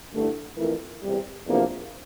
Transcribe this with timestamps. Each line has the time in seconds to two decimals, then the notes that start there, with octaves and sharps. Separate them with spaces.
0.12 G2 D3 A3 E4
0.57 F2 E3 A3 E4 A#4
1.01 E2 C3 G3
1.46 E2 C3 F3 A#3 D4